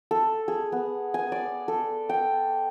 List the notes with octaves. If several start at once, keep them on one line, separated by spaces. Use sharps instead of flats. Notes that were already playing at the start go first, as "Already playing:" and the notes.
A4
G#4
B3
G#5
D5
A4
G5